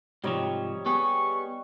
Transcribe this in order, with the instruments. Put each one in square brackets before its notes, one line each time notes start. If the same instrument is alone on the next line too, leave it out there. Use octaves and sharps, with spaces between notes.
[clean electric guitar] G#2 C3 F3 [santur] G3 D#4 C#5
[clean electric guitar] B3 G4 G#4 [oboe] C#6